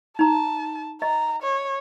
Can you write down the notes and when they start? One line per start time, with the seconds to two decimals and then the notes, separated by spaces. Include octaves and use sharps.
0.19 D#4 A5 A#5
1.02 D#5 A#5
1.43 C#5